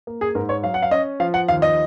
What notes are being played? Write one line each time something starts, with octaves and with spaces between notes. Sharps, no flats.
A#3
G#4
G#2 A#4
C#5
F#3 F5
F#5
F5
C#4 D#5
F3 F5
F#5
D#2 F5
D#5